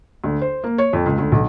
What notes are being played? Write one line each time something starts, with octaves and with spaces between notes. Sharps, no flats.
D2
C5
A#3
C#5
F2
C#2
D2
B1